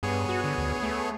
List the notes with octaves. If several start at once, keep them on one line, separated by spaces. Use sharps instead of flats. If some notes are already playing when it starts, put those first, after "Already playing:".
G2 B3 G#4 C#5
F#4
D3
D2
A3